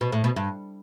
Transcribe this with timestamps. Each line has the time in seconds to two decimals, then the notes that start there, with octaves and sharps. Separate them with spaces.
0.01 B2
0.12 A2
0.24 B2
0.36 G2